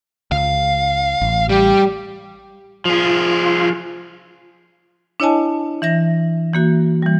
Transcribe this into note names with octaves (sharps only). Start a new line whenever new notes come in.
C#2 F5
A1
G3 G4
F3 F4 G#4
D4 E4 C#5 D#5 G#5 A5
E3 E5 A#6
E3 A#3 F#4
E3 G3